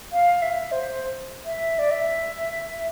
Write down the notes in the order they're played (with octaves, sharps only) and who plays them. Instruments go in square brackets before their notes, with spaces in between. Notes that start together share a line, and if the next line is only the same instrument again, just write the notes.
[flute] F5
E5
C5
E5
D5
E5